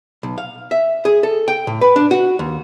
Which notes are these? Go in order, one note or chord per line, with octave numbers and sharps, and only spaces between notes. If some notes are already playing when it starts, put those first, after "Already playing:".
B1
F5
E5
G#4
A4
G5
A2
B4
D4
F#4
D#2